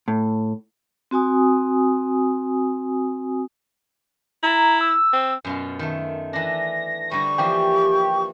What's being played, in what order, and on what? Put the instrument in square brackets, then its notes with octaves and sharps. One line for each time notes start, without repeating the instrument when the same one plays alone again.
[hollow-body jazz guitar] A2
[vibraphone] C4 F#4 G#5 D#6
[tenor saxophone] E4 [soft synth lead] A#5
[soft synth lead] E6
[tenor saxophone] C4
[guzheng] F#2 B2 F4
D#3 A3
[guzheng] E3 D4 [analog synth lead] A#6
[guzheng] D3 G3 [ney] C#6
[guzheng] E3 F3 A#3 [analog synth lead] G4